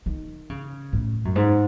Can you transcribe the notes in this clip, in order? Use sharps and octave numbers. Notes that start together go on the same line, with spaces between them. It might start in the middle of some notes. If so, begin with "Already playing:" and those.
D#3
C#3
A2
F#2
G#2